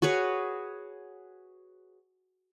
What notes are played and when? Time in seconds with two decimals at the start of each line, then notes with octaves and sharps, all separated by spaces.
0.02 F#4 G#4 B4 C#5